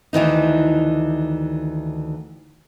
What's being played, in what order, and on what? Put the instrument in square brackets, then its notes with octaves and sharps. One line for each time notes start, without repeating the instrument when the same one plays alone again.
[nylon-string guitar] D2 D#3 E3 D#4